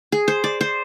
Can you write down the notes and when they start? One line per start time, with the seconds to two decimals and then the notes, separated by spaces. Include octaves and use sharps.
0.12 G#4
0.28 C5
0.44 D5
0.61 C5